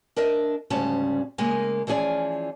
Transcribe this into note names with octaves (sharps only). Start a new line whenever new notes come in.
D4 A#4 D#5 E5
D2 G#2 C#3 G3 C#4 A5
C#3 G#3 A#3 A#4 G#5
E3 F3 C#4 G#4 D5